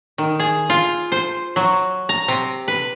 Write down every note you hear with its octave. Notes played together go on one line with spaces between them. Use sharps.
D#3
G#4
F4
C5
F#3
A#5
C3
B4